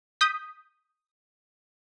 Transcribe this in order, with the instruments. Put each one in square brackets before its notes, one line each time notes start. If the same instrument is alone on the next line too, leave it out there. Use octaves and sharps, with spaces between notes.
[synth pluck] D#6 G6 B6